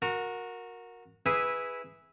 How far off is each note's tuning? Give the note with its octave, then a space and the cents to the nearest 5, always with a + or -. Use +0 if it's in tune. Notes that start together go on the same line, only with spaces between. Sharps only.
F#4 -20 A#4 +0
E4 -10 G#4 -10 B4 +0